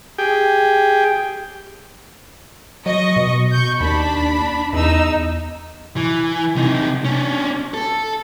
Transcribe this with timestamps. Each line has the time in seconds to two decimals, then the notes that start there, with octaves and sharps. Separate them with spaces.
0.19 G4 G#4 G5
2.86 F#3 D#5 C#6
3.16 B2
3.52 C#6 G6
3.80 D#2 D4 A5 B5
4.73 E2 D#4 E6
5.97 E3
6.56 C3 D#4
7.05 C#4 D4
7.74 A4